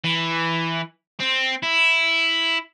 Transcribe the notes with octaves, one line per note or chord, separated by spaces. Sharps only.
E3
C4
E4